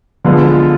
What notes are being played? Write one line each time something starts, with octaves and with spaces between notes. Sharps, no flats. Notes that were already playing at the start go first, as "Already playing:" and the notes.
D3 F3 G#3 B3 F4
F4